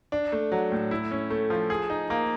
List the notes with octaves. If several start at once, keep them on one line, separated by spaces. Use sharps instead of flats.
D4
A3
F#3
A2
E4
C#4
A3
F3
G#4
D#4
A#3